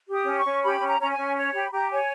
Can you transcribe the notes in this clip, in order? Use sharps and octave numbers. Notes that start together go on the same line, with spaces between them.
G4 D#6
C#4
C#6
C#4
G4 B5
C#4
A#5
C#4 A#5
G#5
C#4
C#5
G4 B5
G4 A#5
C#5 G#5